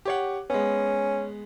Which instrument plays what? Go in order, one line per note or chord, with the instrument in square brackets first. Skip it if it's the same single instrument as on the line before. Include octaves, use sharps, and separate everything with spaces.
[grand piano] G4 C#5 F#5
[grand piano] G#3 B3 [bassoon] C#4